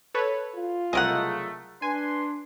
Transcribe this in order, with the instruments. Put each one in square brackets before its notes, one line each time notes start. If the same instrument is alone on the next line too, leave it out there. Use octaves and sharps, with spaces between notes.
[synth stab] A4 B4 C#5
[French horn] F4
[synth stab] C2 D#5 [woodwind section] C#3 F#3 A3 [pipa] G#4 A#4 F#5
[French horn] D4 [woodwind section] B4 C6 [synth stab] G#5